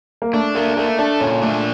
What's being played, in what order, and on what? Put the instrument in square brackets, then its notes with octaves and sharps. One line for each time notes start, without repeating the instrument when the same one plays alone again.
[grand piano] A#3
[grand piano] A3 [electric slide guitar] D4
[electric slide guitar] A3 [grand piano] A#3
[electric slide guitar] A3 [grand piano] A#3
[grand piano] D4 [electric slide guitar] A4
[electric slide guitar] A#2 [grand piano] C#4
[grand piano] A3 [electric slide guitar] D4